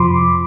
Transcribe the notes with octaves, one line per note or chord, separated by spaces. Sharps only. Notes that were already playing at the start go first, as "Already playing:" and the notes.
Already playing: F2 C3 F3 B5 C6 D6